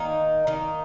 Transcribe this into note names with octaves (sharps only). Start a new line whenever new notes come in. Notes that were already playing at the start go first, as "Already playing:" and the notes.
Already playing: D#3 A#3 D#4
D#3 A#3 D#4